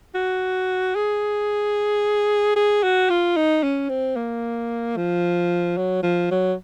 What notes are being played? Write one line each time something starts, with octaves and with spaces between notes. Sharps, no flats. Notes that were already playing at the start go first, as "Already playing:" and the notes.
F#4
G#4
G#4
F#4
F4
D#4
C#4
C4
A#3
F3
F#3
F3
F#3